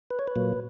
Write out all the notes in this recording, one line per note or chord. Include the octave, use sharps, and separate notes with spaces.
B4
C#5
B4
A#2 F#3 A#3